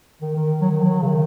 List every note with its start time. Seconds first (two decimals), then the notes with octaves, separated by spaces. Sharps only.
0.22 D#3
0.36 D#3
0.61 F#3
0.71 D#3
0.81 F#3
1.02 C#3
1.08 D#3